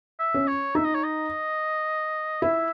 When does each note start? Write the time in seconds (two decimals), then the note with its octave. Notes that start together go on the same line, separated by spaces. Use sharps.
0.19 E5
0.34 C#4
0.48 C#5
0.75 D#4 E5
0.85 D#5
0.95 C#5
1.04 D#5
2.42 E4 E5